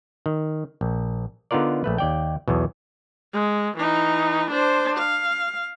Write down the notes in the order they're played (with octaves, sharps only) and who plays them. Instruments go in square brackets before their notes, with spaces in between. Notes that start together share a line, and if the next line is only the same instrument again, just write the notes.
[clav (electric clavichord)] D#3
A#1
D3 B3 D#4 F4 A#4 D5
A#1 A3 B4
D#2 D5 G5
B1 E2 B2
[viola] G#3
E3 D#4
D4 C5
F5